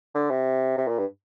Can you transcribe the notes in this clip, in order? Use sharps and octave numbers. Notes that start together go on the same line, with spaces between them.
D3
C3
C3
A#2
G2